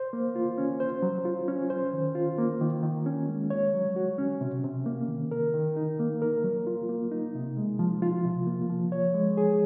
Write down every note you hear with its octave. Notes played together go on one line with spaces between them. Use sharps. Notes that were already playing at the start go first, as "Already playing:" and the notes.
Already playing: C5
A#3
F4
C#4
C5
F#3
F4
C#4
C5
D#3
F4
A#3
D#3
D#3
C#4
G#3
C#5
F#3
F#4
C#4
C3
C3
A#3
D#3
A#4
D#3
D#4
A#3
A#4
F#3
F4
A#3
D#4
C3
G#3
F3
F4
C3
A#3
F3
C#5
G#3
G#4